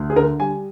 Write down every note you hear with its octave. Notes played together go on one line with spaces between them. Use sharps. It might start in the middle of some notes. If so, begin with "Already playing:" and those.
Already playing: D2
G#4
D3 A#4
G3 G#5